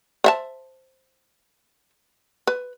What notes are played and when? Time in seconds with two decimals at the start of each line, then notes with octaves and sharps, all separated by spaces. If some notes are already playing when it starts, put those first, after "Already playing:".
0.24 C5 E5 A5
2.47 B4